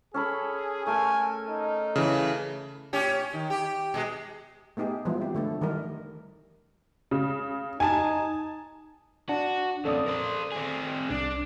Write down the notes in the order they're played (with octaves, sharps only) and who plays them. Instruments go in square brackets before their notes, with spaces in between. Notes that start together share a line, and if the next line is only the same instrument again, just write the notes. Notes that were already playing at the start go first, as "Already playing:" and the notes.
[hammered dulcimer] C#4 A4 B5 [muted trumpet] G#4
[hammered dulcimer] A3 A4 A#4 [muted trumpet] G#5
[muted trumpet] D#4
[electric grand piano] C#3 E3
[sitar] A2 C#4 G4
D#3
G4
B2 G#3
[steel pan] A3 B3 D#4 G4 G#4
E3 F3 G3 G#3 B3 E4
C4 G4
D3 A3 A4 B4
D#3 E3 G3 D#4 A#4
[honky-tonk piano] C#3
[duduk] D#4 [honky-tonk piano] G#5 A5
[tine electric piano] D4 [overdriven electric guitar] F#4
[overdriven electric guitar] F2 C#3 [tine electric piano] A4 D5 D#6
[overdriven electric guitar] A#4 C5
C4 G#4
[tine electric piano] C2 [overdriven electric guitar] D4